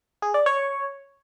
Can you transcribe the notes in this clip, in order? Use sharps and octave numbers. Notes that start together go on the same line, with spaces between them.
G#4
D5
C#5